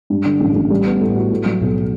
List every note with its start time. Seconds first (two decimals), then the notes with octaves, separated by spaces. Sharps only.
0.10 G2
0.26 D3
0.40 A1
0.55 A1
0.70 G3
0.86 B3
1.00 A2
1.16 F#4
1.31 A2
1.46 F#3
1.61 B1